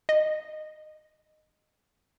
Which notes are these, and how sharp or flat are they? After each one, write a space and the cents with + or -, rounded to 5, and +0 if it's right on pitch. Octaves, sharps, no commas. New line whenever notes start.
D#5 -15